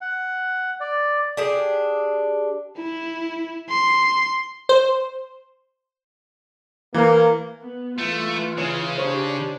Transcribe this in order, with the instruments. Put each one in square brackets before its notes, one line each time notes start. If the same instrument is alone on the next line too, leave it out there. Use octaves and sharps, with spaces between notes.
[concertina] F#5
D5
[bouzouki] D4 G4 G#4
[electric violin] E4
C6
[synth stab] C5
[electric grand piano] E3 F5 [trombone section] A#3
[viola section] B3
[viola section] E3 F4 [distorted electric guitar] A3
[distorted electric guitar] C#3 [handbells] C#5
[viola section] D4 D#4 G4 [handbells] C5 C#5 C#6